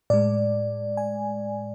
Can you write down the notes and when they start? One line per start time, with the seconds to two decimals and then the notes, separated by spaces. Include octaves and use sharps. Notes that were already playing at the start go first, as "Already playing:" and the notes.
0.10 A2 G#3 D5
0.97 G#5